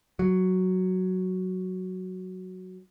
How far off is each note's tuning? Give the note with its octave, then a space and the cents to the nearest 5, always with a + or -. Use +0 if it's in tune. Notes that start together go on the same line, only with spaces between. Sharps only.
F#3 +0